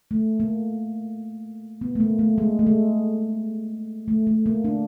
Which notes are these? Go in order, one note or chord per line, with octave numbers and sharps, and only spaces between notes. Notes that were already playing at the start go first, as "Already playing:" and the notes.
A3
A#3
B3
A3
A#3
A3
G#3
A3
G#3
A3
A3
A#3
D4